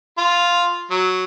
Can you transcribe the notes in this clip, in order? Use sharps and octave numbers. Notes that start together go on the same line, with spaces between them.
F4
F#3